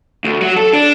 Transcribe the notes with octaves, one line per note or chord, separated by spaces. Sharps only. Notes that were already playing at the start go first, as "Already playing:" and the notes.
D2
F#3
A4
D4